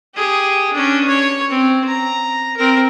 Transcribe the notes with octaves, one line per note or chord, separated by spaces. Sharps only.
G4 G#4
C#4 D4
C#5
C4
A#5
C4 A#4